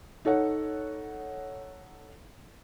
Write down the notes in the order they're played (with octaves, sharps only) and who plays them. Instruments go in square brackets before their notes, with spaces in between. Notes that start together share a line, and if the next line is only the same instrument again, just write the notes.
[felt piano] D#4 A4 C#5 F#5